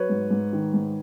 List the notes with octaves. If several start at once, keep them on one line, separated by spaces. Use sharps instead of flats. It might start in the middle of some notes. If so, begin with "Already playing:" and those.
Already playing: F#3 B4 C#5
G#2
G#2
D#3
G#2